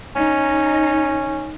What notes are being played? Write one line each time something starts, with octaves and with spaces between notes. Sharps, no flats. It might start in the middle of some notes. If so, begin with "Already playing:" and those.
C#4 D#4